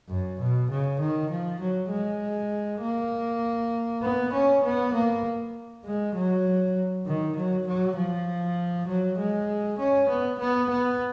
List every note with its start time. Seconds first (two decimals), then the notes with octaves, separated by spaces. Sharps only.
0.09 F#2
0.40 B2
0.70 C#3
1.00 D#3
1.30 F3
1.60 F#3
1.90 G#3
2.81 A#3
4.03 B3
4.33 C#4
4.64 B3
4.94 A#3
5.85 G#3
6.15 F#3
7.07 D#3
7.36 F#3
7.67 F#3
7.96 F3
8.88 F#3
9.18 G#3
9.79 C#4
10.09 B3
10.39 B3
10.70 B3